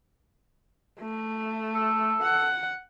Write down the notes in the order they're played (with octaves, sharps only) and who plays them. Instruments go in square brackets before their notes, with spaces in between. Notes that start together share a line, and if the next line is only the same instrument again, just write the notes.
[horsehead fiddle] A3
[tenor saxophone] A4
[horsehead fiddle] F#5